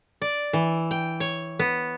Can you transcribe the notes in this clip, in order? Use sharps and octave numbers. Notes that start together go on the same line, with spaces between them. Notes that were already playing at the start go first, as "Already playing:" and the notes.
D5
E3
G5
C#5
B3